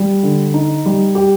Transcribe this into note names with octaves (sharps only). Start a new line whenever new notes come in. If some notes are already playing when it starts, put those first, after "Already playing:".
Already playing: G3
D3
D#4
G3
G4